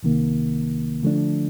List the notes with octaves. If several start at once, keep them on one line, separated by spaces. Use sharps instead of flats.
C2 C3 D#3 A#3
D3 F3 A3 D4